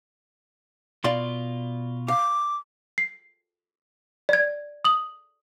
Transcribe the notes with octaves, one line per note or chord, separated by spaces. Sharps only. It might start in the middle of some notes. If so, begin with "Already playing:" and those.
B2 F4 D5 F5 C6
F5 D6
C7
D5 G#6
D#6 F#7